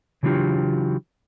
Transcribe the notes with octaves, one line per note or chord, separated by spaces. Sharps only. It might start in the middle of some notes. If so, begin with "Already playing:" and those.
C#3 E3 F#3 D4 F4 G4